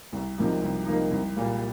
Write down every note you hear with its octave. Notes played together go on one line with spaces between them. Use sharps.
C2
C3 F3 A#3 D#4
C2
C3 F3 A#3 D#4
C2
A#2 G3 A#3